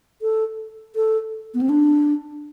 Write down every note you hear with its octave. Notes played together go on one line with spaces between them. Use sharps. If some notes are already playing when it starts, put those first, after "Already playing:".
A4
A4
B3
C4
D4